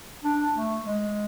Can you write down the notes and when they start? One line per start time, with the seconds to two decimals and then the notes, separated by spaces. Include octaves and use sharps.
0.24 D4
0.55 A3
0.85 G#3